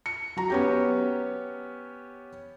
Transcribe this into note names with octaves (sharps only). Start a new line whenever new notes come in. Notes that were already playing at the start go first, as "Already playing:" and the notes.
C#7
F#3 A#5
B3 C#4 G4